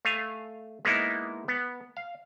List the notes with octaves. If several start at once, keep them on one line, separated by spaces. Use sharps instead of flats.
A3 F5 G#5
G#3 A#3 B3 D#4 E4
B3
F5